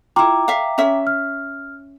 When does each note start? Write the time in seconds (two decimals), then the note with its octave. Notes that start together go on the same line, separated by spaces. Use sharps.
0.16 E4 F4 G5 A#5 D6
0.48 E5 F5
0.78 C#4 E5
1.07 F6